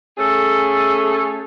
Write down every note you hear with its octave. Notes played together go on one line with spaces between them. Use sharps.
A3 C#4 G#4 A4